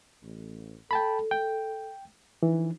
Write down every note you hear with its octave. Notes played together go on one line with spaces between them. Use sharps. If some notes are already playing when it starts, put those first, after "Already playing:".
A1
A4 G5 A5 B5
G5
D3 E3 F3 D#4